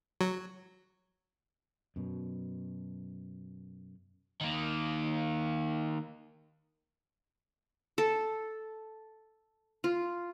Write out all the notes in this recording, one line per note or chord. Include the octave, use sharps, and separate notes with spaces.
F#3
F#2 B2
D#3 A#3
A4
F4